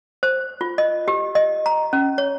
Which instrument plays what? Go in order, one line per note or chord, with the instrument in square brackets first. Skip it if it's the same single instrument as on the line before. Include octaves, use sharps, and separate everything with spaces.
[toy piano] C5
F4
D#5
G4
D#5
A#5
C#4
C#5